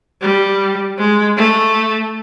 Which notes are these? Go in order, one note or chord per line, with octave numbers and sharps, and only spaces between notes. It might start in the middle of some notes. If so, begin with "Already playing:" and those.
G3
G#3
A3